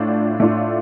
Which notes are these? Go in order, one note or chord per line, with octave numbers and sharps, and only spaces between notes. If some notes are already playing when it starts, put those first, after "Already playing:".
Already playing: A2 A3 D4 F4
A2 A3 D4 F4